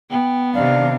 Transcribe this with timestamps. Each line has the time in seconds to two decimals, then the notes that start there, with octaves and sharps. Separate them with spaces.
0.10 B3 G5
0.54 C3 D#3 D4 D5 F5